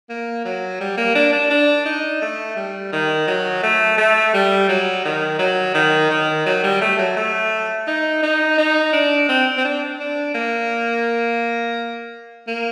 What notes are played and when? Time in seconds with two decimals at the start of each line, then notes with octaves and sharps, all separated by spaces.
0.09 A#3
0.45 F#3
0.80 G3
0.97 A#3
1.15 D4
1.33 D4
1.50 D4
1.86 D#4
2.22 A3
2.56 G3
2.93 D#3
3.27 F#3
3.63 A3
3.98 A3
4.34 G3
4.69 F#3
5.05 D#3
5.39 F#3
5.75 D#3
6.11 D#3
6.46 F#3
6.64 G3
6.81 A3
6.99 F#3
7.17 A3
7.87 D#4
8.23 D#4
8.58 D#4
8.93 D4
9.29 C4
9.58 C4
9.65 D4
10.00 D4
10.35 A#3
12.48 A#3